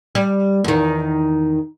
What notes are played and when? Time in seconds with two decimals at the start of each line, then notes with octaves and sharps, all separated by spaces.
0.15 G3
0.64 E2 D#3